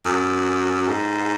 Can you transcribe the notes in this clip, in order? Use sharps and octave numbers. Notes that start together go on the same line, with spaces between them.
F#2
G#2